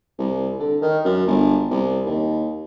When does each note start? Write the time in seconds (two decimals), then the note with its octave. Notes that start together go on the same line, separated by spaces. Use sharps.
0.18 C2
0.60 D3
0.82 D#3
1.05 F#2
1.26 G1
1.71 C2
2.06 D#2